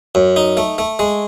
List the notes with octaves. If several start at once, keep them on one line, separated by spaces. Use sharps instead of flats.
F#2
D#4
A3
A3
G#3